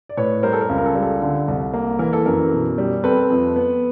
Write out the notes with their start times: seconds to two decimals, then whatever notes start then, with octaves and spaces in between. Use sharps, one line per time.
0.09 D5
0.17 A2 B4 C#5
0.43 G3 A#4 C5
0.53 A4
0.61 A#4
0.69 C#2
0.78 A#4
0.86 A4
0.95 G3
1.02 A4
1.22 D3
1.48 C2
1.73 A#3
1.99 E3 A#4
2.13 A4
2.26 F#2 A#4
2.52 B2
2.78 G3
3.04 C4 A4 B4
3.30 F2
3.56 B3